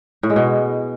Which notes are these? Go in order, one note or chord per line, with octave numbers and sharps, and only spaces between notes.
A2
G#3
B2